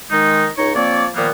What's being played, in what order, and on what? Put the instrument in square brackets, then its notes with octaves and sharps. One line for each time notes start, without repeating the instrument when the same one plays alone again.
[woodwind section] D#3 G#3 D#4
C#2 D#4 C#5 C#6
F3 A#3 C4 C#5 D5
A#2 D#3 F3 G3 A#3 B3